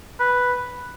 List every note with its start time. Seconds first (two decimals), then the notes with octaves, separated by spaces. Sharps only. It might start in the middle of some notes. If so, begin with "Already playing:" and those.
0.20 B4